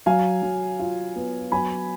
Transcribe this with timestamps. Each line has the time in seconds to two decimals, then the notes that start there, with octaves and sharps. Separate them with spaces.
0.06 F#3 F5 G#5
0.42 F#3
0.79 F4
1.16 B3
1.52 F#3 G#5 B5